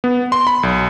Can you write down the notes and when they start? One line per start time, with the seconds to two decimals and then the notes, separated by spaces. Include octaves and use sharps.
0.04 B3
0.32 C6
0.47 B5
0.63 B1